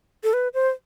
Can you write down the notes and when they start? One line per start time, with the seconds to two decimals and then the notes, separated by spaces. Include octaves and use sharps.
0.24 A4
0.33 B4
0.54 C5